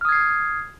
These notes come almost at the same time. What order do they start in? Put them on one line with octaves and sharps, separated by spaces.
F6 D#6 G#6 C7